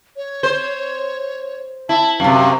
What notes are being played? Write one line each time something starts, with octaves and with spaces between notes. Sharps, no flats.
C#5
C5
E4 A5
F#2 C3 F5